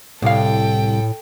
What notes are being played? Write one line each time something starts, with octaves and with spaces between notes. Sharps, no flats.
C2 A2 A4 F5 G5